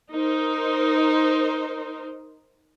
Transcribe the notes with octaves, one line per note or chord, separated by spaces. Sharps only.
D#4 A#4 C5